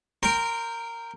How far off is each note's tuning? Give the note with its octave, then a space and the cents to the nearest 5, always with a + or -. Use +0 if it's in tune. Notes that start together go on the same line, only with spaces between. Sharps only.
A#4 -10 G5 +0 C6 +0